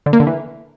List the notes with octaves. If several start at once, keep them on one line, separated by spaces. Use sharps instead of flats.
D3
A#3
D3
E3